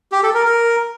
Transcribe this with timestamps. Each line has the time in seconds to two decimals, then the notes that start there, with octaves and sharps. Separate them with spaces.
0.12 G4
0.23 A4
0.34 A#4
0.45 A#4